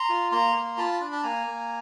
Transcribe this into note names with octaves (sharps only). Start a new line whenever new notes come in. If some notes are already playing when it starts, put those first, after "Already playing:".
Already playing: A#5 C6
F4
A#3 A#5 C6
A#3
F4 A5 B5
D4
A5
A#3 G#5 A#5
A#3